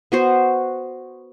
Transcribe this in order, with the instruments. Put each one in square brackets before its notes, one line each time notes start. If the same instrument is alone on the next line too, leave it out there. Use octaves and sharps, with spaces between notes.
[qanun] B3 F#4 C5